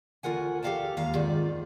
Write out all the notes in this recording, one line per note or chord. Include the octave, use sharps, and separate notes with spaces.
D2 F4 A#4 F#5 G#5
G4 A4 D#5 F5 G5 A5
D#2 G3 F5 A#5
G#2 D#3 C4 F4 D5